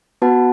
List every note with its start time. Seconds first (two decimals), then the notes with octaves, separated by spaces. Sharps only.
0.22 B3 F#4 B4 F#5 A5